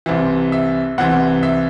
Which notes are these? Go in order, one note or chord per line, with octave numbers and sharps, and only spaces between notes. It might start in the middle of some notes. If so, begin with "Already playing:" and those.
C2 C3 E3
E5
C2 C3 E3 F#5
E5